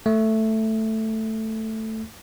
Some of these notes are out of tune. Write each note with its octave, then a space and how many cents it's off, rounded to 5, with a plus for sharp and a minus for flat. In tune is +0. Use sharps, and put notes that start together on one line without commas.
A3 +5